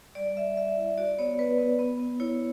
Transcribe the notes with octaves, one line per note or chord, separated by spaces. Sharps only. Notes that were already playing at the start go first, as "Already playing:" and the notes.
G3 D5
G3 E5
G3 E5
E4
F#4 D5
B3 C#5
B3 B4
B3
B3
B3
E4 C#5